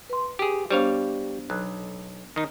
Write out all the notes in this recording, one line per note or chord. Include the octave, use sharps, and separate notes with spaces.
B4 C6
G4 G#4
G3 B3 D4 C5 C#5 F5
B1 F#6
D#3 D#4